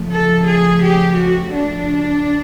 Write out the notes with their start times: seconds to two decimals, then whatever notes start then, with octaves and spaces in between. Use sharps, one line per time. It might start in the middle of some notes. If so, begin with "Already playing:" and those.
Already playing: C#3 F3 A3
0.12 A4
0.48 G#4
0.83 G4
1.18 F#4
1.54 D4